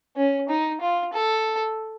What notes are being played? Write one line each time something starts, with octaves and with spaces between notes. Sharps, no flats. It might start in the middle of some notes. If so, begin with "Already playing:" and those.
C#4
D#4
F4
A4